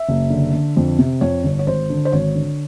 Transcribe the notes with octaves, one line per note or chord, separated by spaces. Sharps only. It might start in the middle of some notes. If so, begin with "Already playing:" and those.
Already playing: E5
F#1
D3
D3
F2
C3
F2 C#5
G1
C#5
G#1 C5
D3
C5
G#1 C#5
D3